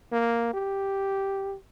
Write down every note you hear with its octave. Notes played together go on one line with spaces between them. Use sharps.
A#3
G4